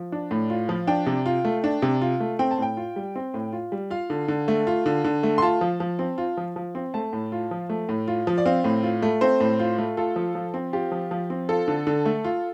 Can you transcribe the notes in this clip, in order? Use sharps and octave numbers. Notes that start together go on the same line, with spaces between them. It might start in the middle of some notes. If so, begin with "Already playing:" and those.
Already playing: F3
D4
A2
F4
F3
D4 G5
C3
F4
A3
D4
C3
F4
A3
C4 G5
A5
A2 G5
F4
G3
C4
A2
F4
G3
F4 F5
D3
D3
A3
F4
D3
D3
A3
C6
F4 A5
F3
F3
C4
F4
F3
F3
C4
A3 A5
A2
F4
F3
A3
A2
F4
F3
D5
C4 F5
A2
F4
A3
C4 C5
A2
F4
A3
F4 A4
F3
F3
C4
F4 G4
F3
F3
C4
F4 A4
D3
D3
A3
F4